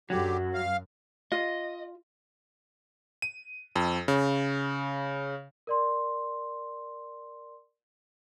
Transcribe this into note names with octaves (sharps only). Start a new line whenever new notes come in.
F#2 D3 F#3 G4
F5
F4 D#5
D#7
F2
C#3
A#4 D5 C6